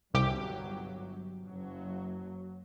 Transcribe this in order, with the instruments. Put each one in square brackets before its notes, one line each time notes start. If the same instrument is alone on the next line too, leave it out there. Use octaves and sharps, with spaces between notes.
[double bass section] G1 F#3 [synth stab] C2 G4
[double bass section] F#1 F#3